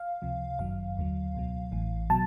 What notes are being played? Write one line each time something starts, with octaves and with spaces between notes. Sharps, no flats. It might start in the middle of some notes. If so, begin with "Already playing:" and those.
Already playing: F5
C#2 C3 F3
G1 F#2 D#3 F#3 F5
D#2 D3 F#3
C#2 B2 F#3
A1 A2 E3
B2 F#3 A5